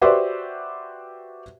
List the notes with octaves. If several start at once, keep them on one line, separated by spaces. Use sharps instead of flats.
F#4 G4 B4 C5 D5 E5